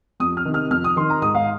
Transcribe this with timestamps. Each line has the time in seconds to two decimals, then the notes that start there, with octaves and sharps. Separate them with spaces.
0.20 F2 D#6
0.37 F6
0.45 C3 D#3
0.54 F6
0.71 F2 F6
0.84 D#6
0.96 D#3 C6
1.10 A#5
1.22 G#2 D#6
1.35 F5